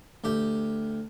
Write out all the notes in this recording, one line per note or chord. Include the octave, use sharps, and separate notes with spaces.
D2 G4